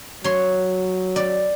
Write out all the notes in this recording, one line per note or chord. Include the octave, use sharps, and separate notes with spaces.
F#3 C#5 C6
D5